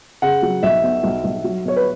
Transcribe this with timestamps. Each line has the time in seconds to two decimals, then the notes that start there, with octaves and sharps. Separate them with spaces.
0.22 C#3 F#5
0.42 F#3
0.63 B1 E5
0.83 B2
1.03 B1
1.24 B1
1.44 F#3
1.65 B2 C#5
1.76 B4